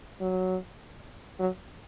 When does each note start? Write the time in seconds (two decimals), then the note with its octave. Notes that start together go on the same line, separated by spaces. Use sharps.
0.21 F#3
1.40 F#3